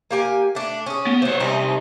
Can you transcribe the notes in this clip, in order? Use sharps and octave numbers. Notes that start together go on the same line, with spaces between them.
A#3 G4 G#5
A3 D4
C#4 G#4
B3
E3 F#3 C5 C#5
C2 C4 D#4